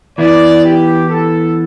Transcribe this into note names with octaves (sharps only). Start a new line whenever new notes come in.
E3 B3 E4 D5
G4
A4